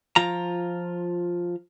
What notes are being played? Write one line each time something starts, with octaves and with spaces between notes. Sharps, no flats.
F3 F4 A#5